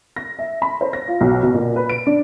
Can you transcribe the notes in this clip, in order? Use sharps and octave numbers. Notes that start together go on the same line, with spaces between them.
A#6
E5
B5
C5
A#6
F4
B1
B2
A#2
B4
D7
D4